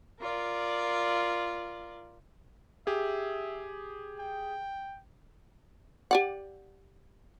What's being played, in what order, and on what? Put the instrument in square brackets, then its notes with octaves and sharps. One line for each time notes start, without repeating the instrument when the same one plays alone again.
[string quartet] F4 A#4 D5
[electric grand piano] G4 G#4 [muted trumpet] E5
[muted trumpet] G5
[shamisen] G4 D5 F#5